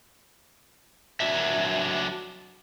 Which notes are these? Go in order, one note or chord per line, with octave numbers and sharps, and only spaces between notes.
F#3 D4 E5